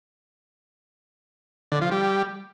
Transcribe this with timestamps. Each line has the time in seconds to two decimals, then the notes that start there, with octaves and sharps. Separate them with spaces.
1.72 D3
1.81 F3
1.91 G3